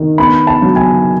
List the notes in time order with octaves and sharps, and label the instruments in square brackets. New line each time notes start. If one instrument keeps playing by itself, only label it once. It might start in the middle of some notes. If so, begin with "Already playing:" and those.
Already playing: [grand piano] D#3
B3 B5
A5
F#3
G#5